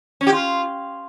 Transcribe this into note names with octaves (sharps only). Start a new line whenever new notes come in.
C#4
G4
F4